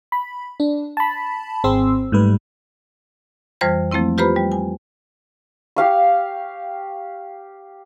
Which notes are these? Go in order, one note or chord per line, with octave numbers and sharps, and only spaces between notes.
B5
D4
A5 B5
G#1 C4 G#4 C6 E6
G#2 G3 A3 B4
F2 E3 G3 C5 F6 A#6
F3 A3 A#3 C4 E4
F4 G4 B4 C5 A#5 B5
G3
G#5
G4 F5 C#6